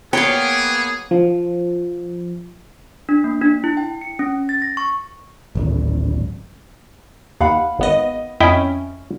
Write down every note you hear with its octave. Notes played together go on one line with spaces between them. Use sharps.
F#3 A#3 B3 G#4 C#5 F5 G5
F3
D4
A#3
D4
E4
G5
C#7
C#4
A6
A#6
C#6
D1 G#1
D#2 F5 F#5 B5
G#1 B3 D#5
F2 C#4 E4 D#5 G5